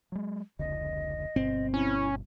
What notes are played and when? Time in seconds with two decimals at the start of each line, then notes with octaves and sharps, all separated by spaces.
0.12 F#3 G#3
0.59 F1 C#2 D3 D#5
1.36 G1 G2 B2 C4
1.74 C#4 E4